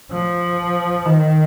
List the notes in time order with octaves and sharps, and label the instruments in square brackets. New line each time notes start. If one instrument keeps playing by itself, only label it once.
[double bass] F3
D#3